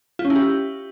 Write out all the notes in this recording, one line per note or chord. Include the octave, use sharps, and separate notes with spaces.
F4
C#4
E4
G4